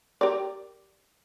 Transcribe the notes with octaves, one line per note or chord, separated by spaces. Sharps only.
G4 A#4 D5